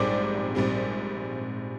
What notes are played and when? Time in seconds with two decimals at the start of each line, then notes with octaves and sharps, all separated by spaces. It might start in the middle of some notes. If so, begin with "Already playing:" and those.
Already playing: A#1 G#2 G3 C4 D5 D6
0.55 A#1 G#2 G3 C4